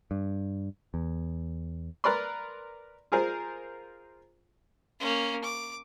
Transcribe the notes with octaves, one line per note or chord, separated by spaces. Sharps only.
G2
E2
A#4 B4 D5 B5 C6
F4 G#4 A#4 C5
A#3 C#4
D6